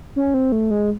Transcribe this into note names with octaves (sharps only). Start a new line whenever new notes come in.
C#4
C4
A3
G#3